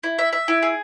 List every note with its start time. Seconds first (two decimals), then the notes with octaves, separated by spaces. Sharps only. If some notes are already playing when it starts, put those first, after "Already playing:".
0.04 E4
0.19 E5
0.33 E5
0.48 E4
0.63 G#4